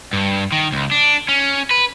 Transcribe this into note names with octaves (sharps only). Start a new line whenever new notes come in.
G2
D#3
C#2
D4
C#4
B4